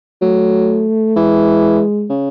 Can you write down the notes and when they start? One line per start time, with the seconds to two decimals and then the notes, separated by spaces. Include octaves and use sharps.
0.22 F#3 A3
1.16 E3 G#3
2.10 C#3